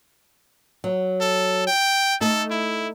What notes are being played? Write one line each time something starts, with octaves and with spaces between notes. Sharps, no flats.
F#3
A4
G5
A3 D#4 A4
E4